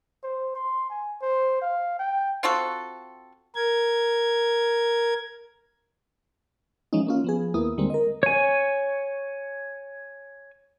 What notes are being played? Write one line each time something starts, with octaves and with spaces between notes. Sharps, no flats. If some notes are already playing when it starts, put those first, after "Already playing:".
C5
C6
G#5
C5
F5
G5
C4 F4 F#4 A4
A#4 G#6
E3 F3 G#3 C#4 D#4
A#3 C#4 F4
F3 B3 G#4
D#2 A#3 B3 E4 D#6
D#2 D3 G3 G#3 A#3 C4
A#4 D#5
C#5 G#5